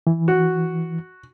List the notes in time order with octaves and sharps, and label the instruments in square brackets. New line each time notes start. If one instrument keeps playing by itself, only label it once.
[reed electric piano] E3
[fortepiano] F#4